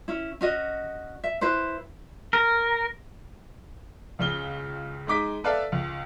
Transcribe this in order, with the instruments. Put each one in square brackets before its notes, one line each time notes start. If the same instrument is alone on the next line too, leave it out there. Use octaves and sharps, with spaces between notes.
[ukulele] C#4 E4
C#4 F#4 D#5
E5
E4 B4 C5
[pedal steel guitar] A#4
[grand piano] C#2 C#3 G7
G#3 D#4 D6 B6
A4 B4 D5 E5 F5 A5
C#2